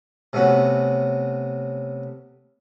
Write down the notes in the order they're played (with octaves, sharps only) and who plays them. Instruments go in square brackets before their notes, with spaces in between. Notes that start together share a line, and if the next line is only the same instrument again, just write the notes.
[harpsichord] C3 A3 B3 C#4 F#4